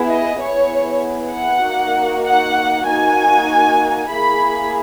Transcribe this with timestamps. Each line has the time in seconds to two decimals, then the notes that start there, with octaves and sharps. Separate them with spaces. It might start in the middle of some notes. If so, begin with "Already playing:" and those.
Already playing: B3 E4 G#4
0.09 D#5
0.40 B3 E4 G#4 C#5
1.32 F#5
1.63 A#3 D#4 F#4
2.25 F#5
2.87 A#3 D#4 F#4 G#5
4.10 A#3 E4 G#4 B5